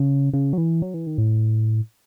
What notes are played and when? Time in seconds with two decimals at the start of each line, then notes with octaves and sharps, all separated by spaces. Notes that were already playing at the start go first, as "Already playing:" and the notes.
Already playing: C#3
0.33 C#3
0.53 F#3
0.58 E3
0.82 F#3
0.94 E3
1.07 D#3
1.18 A2